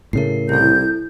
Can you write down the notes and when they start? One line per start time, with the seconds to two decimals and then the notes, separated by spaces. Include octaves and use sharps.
0.13 A2 C#3 A3 A#4 C7
0.49 C2 E4 A4 G6